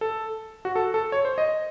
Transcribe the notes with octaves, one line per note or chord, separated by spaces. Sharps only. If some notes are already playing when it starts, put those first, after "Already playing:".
A4
F#4
A4
A4
C#5
C5
D#5